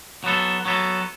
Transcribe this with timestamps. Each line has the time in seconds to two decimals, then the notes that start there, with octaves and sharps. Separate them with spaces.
0.24 F#3 B3 A4
0.65 F#3 B3 A4